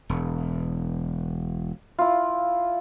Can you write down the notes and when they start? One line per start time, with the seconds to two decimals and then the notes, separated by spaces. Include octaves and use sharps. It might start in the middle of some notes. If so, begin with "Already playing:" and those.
0.10 E1
1.99 E4 F4